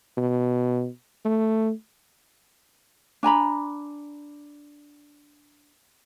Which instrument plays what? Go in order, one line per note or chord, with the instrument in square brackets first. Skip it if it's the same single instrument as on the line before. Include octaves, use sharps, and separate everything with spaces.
[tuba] B2
A3
[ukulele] D4 G#5 A#5 B5